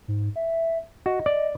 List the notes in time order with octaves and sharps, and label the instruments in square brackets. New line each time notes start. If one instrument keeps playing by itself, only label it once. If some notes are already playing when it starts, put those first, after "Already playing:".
[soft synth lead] G#2
E5
[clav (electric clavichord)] F#4 [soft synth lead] D#5
[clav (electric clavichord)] D5